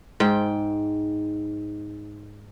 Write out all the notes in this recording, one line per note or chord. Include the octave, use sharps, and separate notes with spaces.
G#2 G5